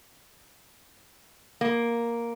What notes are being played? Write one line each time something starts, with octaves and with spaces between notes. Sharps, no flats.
A#3